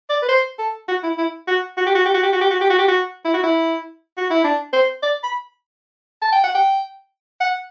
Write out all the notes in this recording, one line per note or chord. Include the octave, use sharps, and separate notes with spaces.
D5
B4
C5
A4
F#4
E4
E4
F#4
F#4
G4
F#4
G4
F#4
G4
F#4
G4
F#4
G4
F#4
G4
F#4
E4
F#4
E4
F#4
E4
D4
C5
D5
B5
A5
G5
F#5
G5
F#5